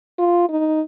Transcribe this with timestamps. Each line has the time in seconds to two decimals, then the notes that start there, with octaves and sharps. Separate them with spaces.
0.18 F4
0.49 D#4